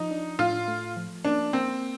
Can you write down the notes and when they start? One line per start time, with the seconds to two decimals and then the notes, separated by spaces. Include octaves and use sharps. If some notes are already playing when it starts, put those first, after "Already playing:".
Already playing: F3 D#4
0.11 D4
0.39 A2 F4
0.68 A3
0.96 F3
1.24 A#3 D4
1.53 A#3 C4